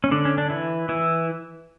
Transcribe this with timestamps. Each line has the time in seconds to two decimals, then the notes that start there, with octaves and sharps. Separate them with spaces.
0.04 C#4
0.11 D3 D4
0.25 C#4
0.38 D4
0.50 E3 E4
0.89 E3 E4